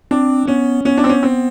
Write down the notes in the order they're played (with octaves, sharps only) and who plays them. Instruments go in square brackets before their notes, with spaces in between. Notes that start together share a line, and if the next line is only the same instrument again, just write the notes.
[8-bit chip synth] C4 [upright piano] D4
[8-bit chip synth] B3 [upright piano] C#4
[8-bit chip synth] B3 [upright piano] C#4
[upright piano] D4
C4
C#4
C4